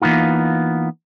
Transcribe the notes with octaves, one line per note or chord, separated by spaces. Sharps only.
E3 A#3 B3 D#4 F4